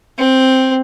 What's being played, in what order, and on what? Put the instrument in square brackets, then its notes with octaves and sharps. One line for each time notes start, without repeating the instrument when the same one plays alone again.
[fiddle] C4